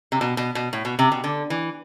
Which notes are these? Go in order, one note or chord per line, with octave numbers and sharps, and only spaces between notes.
C3
B2
B2
B2
A2
B2
C3
B2
D3
E3